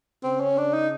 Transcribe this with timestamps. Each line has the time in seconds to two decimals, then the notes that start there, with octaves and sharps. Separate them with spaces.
0.24 C#3 C4
0.41 C#4
0.58 D4
0.74 D#4